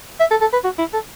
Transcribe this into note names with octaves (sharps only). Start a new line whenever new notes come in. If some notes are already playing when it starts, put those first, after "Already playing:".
E5
A4
A4
B4
F#4
E4
A4